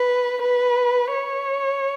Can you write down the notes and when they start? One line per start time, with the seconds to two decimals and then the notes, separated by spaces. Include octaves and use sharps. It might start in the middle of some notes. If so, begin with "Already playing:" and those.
Already playing: B4
0.40 B4
1.12 C#5